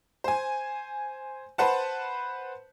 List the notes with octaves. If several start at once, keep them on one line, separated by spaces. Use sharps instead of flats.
C5 G#5
B4 C5 F#5 A5